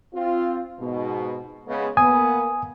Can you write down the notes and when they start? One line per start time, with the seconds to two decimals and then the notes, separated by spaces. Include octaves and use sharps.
0.14 C4 F4
0.79 G#2 B2
1.67 C#3 G#3 B3
1.97 A#3 B3 G#5 D#6